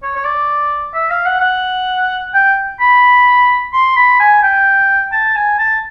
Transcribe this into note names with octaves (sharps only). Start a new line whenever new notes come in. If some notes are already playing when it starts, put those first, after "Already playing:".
C#5
C#5
D5
E5
F5
F#5
F#5
G5
B5
C6
B5
G#5
G5
A5
G#5
A5